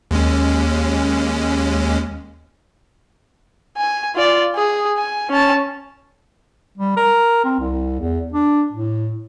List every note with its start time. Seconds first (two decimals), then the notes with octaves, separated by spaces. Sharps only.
0.11 D#2 G#3 C#4
3.77 G#5
4.15 F4 D5
4.56 G#4
4.97 G#5
5.30 C#4 A5
6.78 G3
6.97 A#4
7.44 C4
7.59 C2
8.00 E2
8.32 D4
8.72 A2